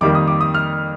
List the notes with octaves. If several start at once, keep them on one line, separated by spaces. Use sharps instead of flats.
F2 D#3 G3 A#3 D6
D#6
D6
D#6
F6